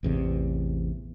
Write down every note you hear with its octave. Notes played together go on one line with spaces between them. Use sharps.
A1 E2 C3